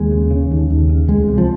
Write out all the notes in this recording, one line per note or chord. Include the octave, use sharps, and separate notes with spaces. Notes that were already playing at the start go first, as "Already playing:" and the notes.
Already playing: D#2 G#3
C#3
C#3
D#2
D#2
C#3
C#2 G#3
C3
F3